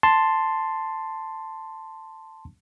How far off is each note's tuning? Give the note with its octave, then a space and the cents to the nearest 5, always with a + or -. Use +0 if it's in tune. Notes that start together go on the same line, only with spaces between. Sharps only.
A5 +5 C6 +0